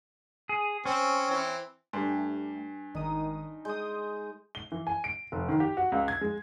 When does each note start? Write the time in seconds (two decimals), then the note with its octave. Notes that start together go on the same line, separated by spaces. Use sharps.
0.49 G#4
0.86 C4 C#4
1.30 E3 C4
1.93 G2 A3 G4 G#5
2.95 G#1 D#3 D#4 D#6
3.65 G#3 D#6 G6
4.55 G7
4.72 E3
4.87 G#5
5.04 D7
5.32 F1
5.49 D#3
5.60 G4
5.77 F#4
5.92 C#2
6.08 G#6
6.21 G#3